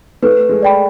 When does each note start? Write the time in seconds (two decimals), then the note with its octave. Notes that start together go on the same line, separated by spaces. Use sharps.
0.22 A3 B4
0.49 G#3
0.63 D5 G5 B5